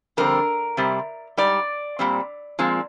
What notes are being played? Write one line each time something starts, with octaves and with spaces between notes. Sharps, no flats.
F2 D3 G3 C4 A#4
C3 G3 C4
G#2 G3 D5
A#2 G3 C4
A#2 F3 G#3 C4